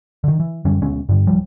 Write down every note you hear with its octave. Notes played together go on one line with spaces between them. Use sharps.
D3 D#3
E3
F#2 D3 G3 C#4
D2 B2 G#3 C#4
G2 D3 G3
D1 F#2 F3 G3